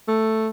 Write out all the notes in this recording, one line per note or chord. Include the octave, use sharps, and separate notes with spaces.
A3